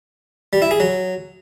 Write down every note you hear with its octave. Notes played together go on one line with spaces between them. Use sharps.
G3
E4
G#4
F#3